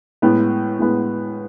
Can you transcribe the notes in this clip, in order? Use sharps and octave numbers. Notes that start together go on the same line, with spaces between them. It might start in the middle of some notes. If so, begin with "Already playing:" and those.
A2 G#3 B3
A2 G#3 B3